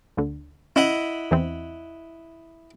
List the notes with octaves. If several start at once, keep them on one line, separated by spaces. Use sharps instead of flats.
D2 D3
C#4 E4 D#5 F#5
E2 E3 C4